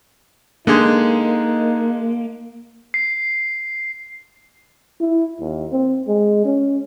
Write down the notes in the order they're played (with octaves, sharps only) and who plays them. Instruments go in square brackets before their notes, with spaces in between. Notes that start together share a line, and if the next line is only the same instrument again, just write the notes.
[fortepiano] D3 G#3 [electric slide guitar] A#3 [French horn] D#4
[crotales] C7
[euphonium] E4
D#2
C4
G#3
C#4